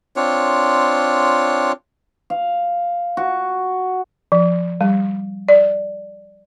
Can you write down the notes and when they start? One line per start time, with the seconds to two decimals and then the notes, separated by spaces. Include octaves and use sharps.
0.16 C4 D4 F4 C#5
2.30 F5
3.17 F#4
4.32 F3
4.81 G3
5.48 D5